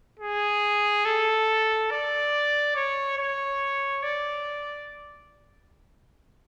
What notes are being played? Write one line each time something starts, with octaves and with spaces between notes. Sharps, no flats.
G#4
A4
D5
C#5
C#5
D5